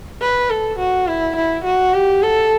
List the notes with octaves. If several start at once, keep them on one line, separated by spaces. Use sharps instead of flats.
B4
A4
F#4
E4
E4
F#4
G4
A4